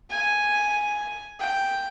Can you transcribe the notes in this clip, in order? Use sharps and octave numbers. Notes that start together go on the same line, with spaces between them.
G#5
G5